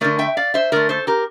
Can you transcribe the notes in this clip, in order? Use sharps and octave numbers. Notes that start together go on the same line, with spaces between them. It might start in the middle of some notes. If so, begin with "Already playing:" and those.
D3 A3 A#4 D5
E5 G5
D5 F5
C5 E5
D3 A3 A#4 D5
A4 C5
G4 A#4